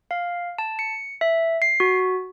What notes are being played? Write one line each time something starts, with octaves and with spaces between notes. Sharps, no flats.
F5
A5
C#7
E5
C7
F#4